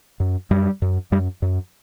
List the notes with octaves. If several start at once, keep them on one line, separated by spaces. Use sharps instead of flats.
F#2
F#2 G3
F#2
F#2 G3
F#2